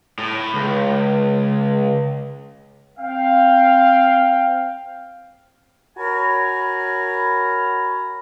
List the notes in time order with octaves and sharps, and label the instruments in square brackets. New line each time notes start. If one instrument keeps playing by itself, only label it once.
[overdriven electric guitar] A2
C#2
[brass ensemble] C4 F5 G5
[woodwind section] F#4 A#4 C#5 G#5 A#5 B5